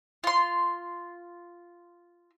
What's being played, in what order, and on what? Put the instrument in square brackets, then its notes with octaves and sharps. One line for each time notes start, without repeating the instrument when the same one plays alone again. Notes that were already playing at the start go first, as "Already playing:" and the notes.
[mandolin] F4 C6